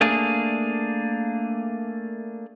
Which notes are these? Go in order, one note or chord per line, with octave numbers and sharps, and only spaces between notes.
A3 A#3 D4 G#4